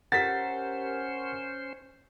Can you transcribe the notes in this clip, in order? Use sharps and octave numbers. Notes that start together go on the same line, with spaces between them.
C#4 G4 A#4 C5 F#5 A#5 A6 B6